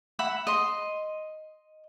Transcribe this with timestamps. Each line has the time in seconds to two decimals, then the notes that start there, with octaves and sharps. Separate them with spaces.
0.19 E5 F#5 B5
0.47 D#5 C6